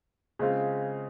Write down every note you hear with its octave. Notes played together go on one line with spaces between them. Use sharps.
C#3 G#3 C4 F4